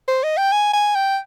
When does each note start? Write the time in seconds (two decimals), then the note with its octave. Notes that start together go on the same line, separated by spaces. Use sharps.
0.08 C5
0.23 D#5
0.37 G5
0.52 G#5
0.73 G#5
0.95 G5